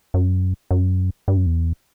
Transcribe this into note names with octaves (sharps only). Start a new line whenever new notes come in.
F#2
F#2
G2
F#2
E2